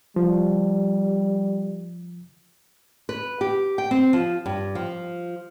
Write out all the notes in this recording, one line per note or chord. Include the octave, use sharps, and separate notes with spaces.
F3 G3
B4
G4
G5
C4
F3
G2
F3